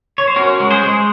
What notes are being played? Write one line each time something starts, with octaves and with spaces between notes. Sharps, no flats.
C#5
C5
C#4 F#4 A#4
G#3
G#4 C5
G#3